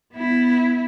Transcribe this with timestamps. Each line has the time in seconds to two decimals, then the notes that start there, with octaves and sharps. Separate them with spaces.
0.13 B3 E4